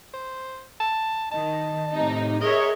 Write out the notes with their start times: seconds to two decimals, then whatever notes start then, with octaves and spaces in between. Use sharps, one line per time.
0.14 C5
0.80 A5
1.32 D#3 D#5 A5
1.93 A2 C3 D#4
2.42 G#4 A#4 C#5 D#5 E5